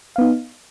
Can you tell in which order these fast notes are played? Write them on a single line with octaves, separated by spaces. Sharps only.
F5 B3 D#4